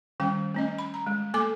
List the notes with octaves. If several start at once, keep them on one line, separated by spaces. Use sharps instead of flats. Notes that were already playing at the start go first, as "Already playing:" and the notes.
D#3 G3 C#4 G5
A3 C#4 D#5
B5
A#5
G#3
A3 A#3 A4 G#5 D6